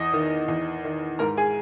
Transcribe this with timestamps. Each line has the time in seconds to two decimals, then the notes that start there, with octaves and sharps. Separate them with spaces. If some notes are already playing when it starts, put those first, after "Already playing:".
Already playing: E2 D#5 D#6
0.13 D#3
0.48 E2
0.85 D#3
1.19 G#2 A#4 A#5
1.37 G#4 G#5